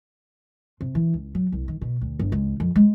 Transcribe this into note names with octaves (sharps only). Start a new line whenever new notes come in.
C3
E3
C#2
F#3
C2
D#3
B2
D2
G1
C#2
F2
G#3